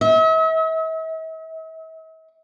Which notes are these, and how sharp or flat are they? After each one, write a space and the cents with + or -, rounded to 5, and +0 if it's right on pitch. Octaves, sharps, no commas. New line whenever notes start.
E5 -45